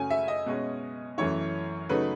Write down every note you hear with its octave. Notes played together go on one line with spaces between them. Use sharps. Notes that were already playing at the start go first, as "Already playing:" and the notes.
Already playing: F#2 C#3 F#3 A3 C#4 G#5
E5
D#5
B2 G#3 C#4
F#2 E3 A3 C#4 E4 C#5
C#3 F#3 A3 D#4 B4